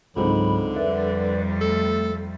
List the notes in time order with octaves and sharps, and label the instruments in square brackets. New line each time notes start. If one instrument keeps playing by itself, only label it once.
[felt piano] C#2 C4 D#4 [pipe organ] G#2 F#3 B5 [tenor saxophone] D3
[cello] F2 G3 [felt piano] A#4 E5 [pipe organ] B4 D5
[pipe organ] A3 [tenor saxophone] A4